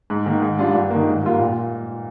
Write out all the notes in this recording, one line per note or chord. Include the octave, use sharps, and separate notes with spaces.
G#2
D#3 A#3
G#2
G3 D4 F4
G2
D#3 A#3
G#2
G3 A#3 F4
A#2